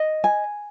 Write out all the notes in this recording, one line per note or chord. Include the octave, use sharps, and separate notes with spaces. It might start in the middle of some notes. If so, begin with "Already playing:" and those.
Already playing: D#5
G#5